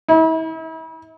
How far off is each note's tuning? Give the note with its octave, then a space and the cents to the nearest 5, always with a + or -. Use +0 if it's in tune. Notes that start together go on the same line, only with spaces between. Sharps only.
E4 -40